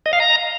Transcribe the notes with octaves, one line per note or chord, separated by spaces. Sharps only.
D#5
F5
A#5